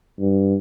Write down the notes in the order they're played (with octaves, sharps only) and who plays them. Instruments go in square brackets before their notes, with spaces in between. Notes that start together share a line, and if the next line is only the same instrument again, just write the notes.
[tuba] G2